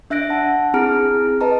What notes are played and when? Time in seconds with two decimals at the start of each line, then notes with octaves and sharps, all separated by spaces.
0.10 D4 E5 F#6 A#6 D7
0.30 F#5 A5
0.74 C4 E4 G#4 A#5 F6 D7
1.41 B4 D#5 A5 A#5